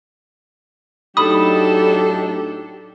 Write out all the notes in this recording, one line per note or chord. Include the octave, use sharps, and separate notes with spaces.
A2 F#3 D4 D#4 G4 A4 B5 D#6